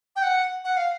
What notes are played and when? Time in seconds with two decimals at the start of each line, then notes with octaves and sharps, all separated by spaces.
0.16 G5
0.22 F#5
0.65 F#5
0.77 F5